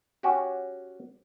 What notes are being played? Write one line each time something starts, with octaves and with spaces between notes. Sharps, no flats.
C#4 F#4 G4